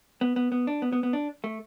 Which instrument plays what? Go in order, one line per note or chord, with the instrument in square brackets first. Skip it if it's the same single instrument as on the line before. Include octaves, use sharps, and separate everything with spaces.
[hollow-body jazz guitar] B3
B3
B3
D4
B3
B3
B3
D4
A3